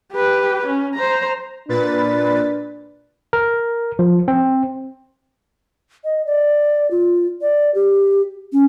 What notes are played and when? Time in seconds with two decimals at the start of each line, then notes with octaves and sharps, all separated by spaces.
0.12 G4 B4
0.65 C#4
0.94 C5 A#5
1.69 A#2 D4 B4 A6
3.33 A#4
3.99 F3
4.28 C4
6.04 D#5
6.26 D5
6.91 F4
7.41 D5
7.75 G4
8.53 C#4